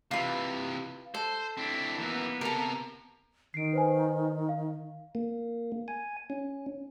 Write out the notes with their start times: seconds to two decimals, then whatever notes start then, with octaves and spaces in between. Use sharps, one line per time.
0.11 C3 E3 F4 B4
1.14 A4 C5
1.57 C4 D4 E4
1.99 F#2 E3 A#3 B3
2.41 C3 A4 A#4 A#5
3.54 D#3 C7 D7
3.73 B4 C5 G#5
4.49 F5
5.15 A#3
5.88 G#5
6.30 C#4